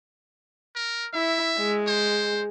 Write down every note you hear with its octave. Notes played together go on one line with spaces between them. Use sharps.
A#4
E4 E5
G#3
C5